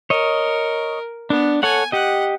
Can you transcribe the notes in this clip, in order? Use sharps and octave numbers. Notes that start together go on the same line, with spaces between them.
A#4 C#5 D#5
B3 D4
A4 C#5 F#5 G#5
G4 D#5 F#5